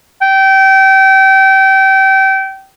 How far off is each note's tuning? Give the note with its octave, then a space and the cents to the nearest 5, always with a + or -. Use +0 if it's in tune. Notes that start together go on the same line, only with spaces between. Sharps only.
G5 -25